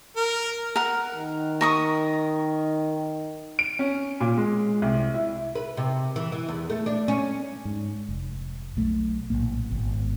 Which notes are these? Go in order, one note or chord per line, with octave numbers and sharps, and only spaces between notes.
A#4
A#4 F#5
D#3
A#4 C#6 D#6
D7
C#4
A#2
G#3
C2
E4
B4
C3
E3
E3
E2
A3
D4
C#4
G#2
F1
B1 A3
A#1 F#2 A2 A#3
G#1 B2